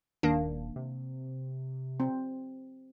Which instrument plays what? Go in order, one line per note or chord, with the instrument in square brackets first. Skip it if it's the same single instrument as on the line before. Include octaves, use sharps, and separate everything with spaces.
[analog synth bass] D#1 [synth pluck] D#3 A#3 D4
[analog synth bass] C3
[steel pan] C4